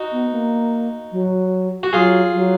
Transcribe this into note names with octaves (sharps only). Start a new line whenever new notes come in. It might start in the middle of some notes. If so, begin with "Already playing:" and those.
Already playing: D#4 F#4
B3
A#3
F#3
F#4
F#3 F4 G#4
F#3